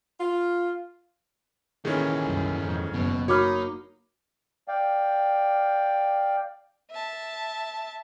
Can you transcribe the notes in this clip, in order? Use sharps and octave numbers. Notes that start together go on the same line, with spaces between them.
F4
A#2 D#3 E3 A3 C#4 G#4
C2 F#2
F2 G#2
F#1 B2
A#3 D#4 F#4 C#5 B5 D6 F6
D5 F5 G5
E5 A5